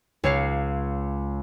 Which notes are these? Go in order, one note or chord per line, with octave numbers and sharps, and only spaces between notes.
C#2 C#5 F5